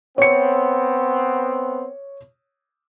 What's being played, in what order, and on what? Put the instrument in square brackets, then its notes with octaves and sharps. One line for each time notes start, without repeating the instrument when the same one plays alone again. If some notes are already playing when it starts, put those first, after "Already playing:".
[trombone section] B3 C4 [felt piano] C#5 C#7